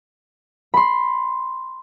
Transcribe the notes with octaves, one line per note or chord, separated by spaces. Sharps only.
B5 C6